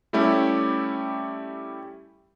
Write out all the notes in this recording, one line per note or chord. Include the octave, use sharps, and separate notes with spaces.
G3 A3 C#4 E4 G4